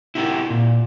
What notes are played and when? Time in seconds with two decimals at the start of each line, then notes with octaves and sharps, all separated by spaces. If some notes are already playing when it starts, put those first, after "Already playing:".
0.15 E4 F#4 G4 A#4
0.50 A#2